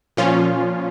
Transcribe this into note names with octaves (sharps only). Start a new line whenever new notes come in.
A#2 F3 C#4 F4